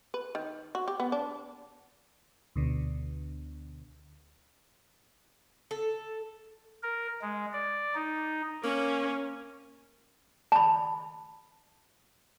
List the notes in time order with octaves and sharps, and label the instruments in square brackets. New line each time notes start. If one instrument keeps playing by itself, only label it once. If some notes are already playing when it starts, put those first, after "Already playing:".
[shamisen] B4
D#3
F#4
G4
B3
D4
[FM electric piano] D2 B2 D3
[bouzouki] A4
[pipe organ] A#4
G#3
D5
D#4
[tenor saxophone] A#3 [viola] C#4
[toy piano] A5 B5